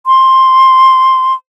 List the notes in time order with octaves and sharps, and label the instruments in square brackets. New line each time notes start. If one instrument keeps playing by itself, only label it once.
[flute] C6